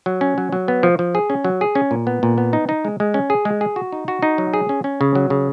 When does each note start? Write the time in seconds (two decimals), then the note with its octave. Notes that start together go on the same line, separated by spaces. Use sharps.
0.06 F#3
0.21 C#4
0.38 F#3
0.52 F#3
0.68 B3
0.83 F3
0.99 F3
1.15 G#4
1.30 C#4
1.45 F#3
1.61 G#4
1.75 C#4
1.91 A#2
2.07 B3
2.23 A#2
2.38 B3
2.53 D#4
2.69 D#4
2.85 G#3
3.00 G#3
3.14 C#4
3.30 G#4
3.45 G#3
3.61 G#4
3.76 F#4
3.92 D#4
4.08 F#4
4.22 D#4
4.38 F#3
4.54 G#4
4.69 C#4
4.84 C#4
5.01 C#3
5.15 F#3
5.30 C#3